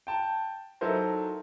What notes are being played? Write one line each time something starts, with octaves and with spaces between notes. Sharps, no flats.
G5 A5
F#3 D#4 E4 A4 A#4 C5